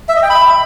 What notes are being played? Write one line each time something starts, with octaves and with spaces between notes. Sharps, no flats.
E5
D#5
G5
B5